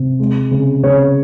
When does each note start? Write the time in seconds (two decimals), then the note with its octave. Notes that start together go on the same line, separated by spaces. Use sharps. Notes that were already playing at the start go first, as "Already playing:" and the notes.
Already playing: C3
0.20 G#3
0.51 C#3
0.83 C#3 C#5